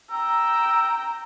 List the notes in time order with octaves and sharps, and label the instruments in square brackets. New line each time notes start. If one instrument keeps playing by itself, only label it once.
[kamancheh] G5 A#5 [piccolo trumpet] E6